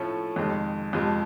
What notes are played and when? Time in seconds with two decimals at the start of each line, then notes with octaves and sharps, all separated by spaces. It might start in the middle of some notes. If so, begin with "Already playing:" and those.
Already playing: A2 F3 A3 C#4
0.36 F2 C3 D#3 G#3
0.93 F2 C3 F3 G#3